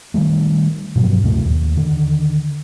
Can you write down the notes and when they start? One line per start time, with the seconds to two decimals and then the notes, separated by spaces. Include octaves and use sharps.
0.14 D#3 F3 G3 A3
0.95 G2 B2 F3 F#3
1.24 D2 A2 C3 A3
1.45 D#2
1.77 D3 D#3